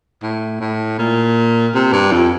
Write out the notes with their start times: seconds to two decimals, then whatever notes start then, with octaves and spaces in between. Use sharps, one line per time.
0.23 A2
0.60 A2
0.99 A#2
1.74 C3
1.93 G2
2.12 F2